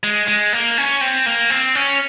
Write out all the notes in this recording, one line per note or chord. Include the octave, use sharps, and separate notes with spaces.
G#3
G#3
A#3
C#4
C4
A#3
C4
C#4